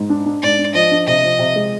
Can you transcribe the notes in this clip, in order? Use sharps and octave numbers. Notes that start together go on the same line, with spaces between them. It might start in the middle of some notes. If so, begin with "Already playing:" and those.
Already playing: G#2
D4
D4
G#2 D5
D4
F3 D#5
D4
C3 D#5
F3
C3
G#3